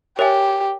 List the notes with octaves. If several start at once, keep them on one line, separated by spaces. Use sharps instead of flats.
G4 A#4 C#5 E5 G#5